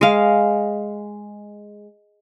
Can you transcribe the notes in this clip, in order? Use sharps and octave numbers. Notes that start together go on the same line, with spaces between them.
G#3 F5